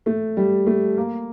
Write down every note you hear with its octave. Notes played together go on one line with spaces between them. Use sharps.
A3
G3
A3
A#3